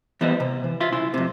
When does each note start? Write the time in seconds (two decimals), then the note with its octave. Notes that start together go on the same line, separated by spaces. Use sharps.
0.21 E3 G3 B3 C5 D#5
0.40 C3
0.64 E3
0.81 F4 E5 F5 C6
0.92 C2 C#3 E4 C6
1.14 F2 C3